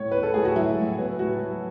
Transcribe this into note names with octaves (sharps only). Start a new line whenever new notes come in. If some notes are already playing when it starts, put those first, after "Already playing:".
Already playing: A2 C#5
B3 B4
A4
A2 G#4
F#4
F#3 E4
A2
B3
A2 F#4
F#3